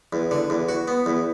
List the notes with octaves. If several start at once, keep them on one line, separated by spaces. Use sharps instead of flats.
E2
D3
E2
F#4
B3
E2